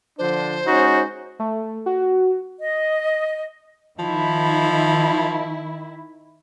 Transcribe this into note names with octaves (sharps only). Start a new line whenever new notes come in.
D3 F3 D4 C5
G#3 C#4 D#4 F#4
A3
F#4
D#5
D#3 F3 E4